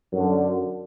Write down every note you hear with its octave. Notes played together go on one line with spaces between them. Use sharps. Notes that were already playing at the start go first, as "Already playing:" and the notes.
F#2 D3 F#3